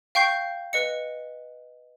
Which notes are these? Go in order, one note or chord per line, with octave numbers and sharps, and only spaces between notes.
F5 G5 C#6 G6 C7
B4 D#5 C#7